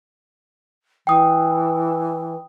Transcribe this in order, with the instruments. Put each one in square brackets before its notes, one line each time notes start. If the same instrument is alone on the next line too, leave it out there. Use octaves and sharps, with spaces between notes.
[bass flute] E3 [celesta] G5 D#6